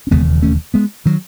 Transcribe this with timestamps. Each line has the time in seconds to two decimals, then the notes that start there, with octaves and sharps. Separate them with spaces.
0.07 C#4
0.11 E1 D#2 C#3 G#3 B3
0.42 A3 C#4
0.74 G#3 B3
1.06 D#3 F#3